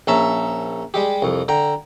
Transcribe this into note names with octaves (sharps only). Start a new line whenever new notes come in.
A#1 C#4 E5 A5 A#5
G3 G#3 G4
C2 F2
D3 G5 A#5